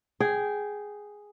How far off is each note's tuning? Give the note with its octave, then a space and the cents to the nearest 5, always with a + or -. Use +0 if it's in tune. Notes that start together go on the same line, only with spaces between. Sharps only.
G#4 +0 G5 -15